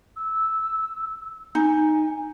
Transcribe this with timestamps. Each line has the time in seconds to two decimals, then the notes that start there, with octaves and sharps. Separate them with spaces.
0.16 E6
1.55 D#4 G#5